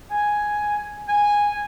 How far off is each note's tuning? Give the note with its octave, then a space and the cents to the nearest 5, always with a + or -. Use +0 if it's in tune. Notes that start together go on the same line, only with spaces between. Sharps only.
G#5 +5
G#5 -10